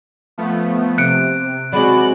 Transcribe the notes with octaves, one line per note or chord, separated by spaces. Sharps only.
F3 A3 B3
C3 C5 F#6 C#7 D7
F#3 G#3 C4 F#4 D5 B5